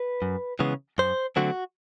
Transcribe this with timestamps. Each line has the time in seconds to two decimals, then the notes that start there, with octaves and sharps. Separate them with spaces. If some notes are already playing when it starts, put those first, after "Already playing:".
Already playing: B4
0.22 F#2
0.59 C#3 E3 G#3 B3
0.98 F#2 C5
1.36 D3 F#3 A3 C4 F#4